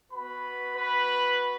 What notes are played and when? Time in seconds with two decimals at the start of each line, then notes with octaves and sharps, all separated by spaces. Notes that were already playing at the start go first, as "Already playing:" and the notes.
0.12 B3 F#4 B4 B5
0.76 B4 B5